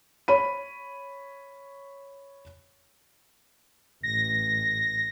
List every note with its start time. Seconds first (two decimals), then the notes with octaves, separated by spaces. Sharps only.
0.28 C#5 B5 D#7
4.03 A1 A#6